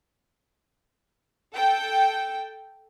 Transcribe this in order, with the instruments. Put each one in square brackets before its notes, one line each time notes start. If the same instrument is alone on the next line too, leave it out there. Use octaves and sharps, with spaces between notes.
[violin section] A4 G5